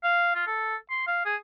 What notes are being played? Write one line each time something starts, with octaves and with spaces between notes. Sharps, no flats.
F5
F4
A4
C6
F5
G#4